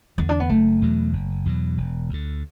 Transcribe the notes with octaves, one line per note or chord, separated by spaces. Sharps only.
E2 D3 B3
D4
B3
F#1 A3
E2 B2 F#3
F#1
E2 B2 F#3
E1
D2 D3